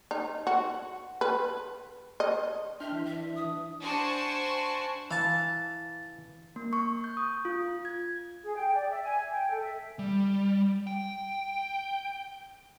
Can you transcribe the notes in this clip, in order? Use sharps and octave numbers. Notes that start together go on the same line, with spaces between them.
D#4
F#4
B4
D#5
D4 E5 G5 C6 F6
E3
E5
D#6
D4 F#4 C5 G#5 A5 C#6
E3 F5 A5
A#3
C#6
G6
D#6
F4
G#6
G#4
G5
D5
E5
G#5
G5
A4
E5
G3
G5